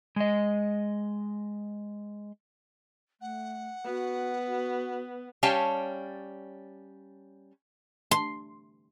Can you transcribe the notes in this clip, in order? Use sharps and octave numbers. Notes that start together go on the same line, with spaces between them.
G#3 D#5
A3 F#5
B3 F#4
F#4
G3 C#4 C#5 F5 G5 A5
C6